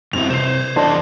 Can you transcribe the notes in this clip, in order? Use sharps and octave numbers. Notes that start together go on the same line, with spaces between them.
G2 C4 E4 F7
C3 B4 C5 C7 E7
E2 D4 A4 C5 D#5 A5